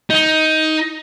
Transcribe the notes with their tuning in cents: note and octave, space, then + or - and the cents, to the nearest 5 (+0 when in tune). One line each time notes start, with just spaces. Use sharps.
D#4 +15